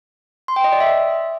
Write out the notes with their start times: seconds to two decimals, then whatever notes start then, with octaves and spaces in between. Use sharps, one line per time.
0.48 C6
0.56 G5
0.64 D#5
0.72 D5
0.80 E5